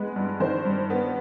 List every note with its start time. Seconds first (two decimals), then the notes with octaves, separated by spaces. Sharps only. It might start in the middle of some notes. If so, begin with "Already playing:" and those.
Already playing: G#3 B3 B5
0.16 G2
0.40 D#3 C5
0.65 G2
0.90 B3